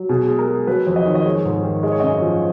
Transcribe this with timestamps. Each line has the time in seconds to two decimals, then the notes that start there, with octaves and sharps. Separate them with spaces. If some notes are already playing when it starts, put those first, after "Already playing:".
Already playing: F#3
0.09 B2 G#4
0.28 G#3
0.39 A#4
0.48 G#3
0.67 F#3 B4
0.87 F2
0.96 D#5
1.06 D#3 C#5
1.15 D#5
1.25 G#3 C#5
1.45 G#2
1.64 D#3
1.83 G#3 D#5
1.92 C#5
2.00 F#2 D#5
2.22 F3